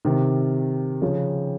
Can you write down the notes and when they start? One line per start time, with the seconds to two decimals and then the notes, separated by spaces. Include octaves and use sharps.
0.05 C3 D#3
1.02 C#3 F3